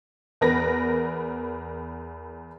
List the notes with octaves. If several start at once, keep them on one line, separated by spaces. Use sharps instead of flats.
E2 A#4 B4 A#6